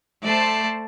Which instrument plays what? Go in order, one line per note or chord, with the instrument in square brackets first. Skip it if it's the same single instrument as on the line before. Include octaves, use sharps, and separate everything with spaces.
[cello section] A3 C5 [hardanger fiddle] D5 A5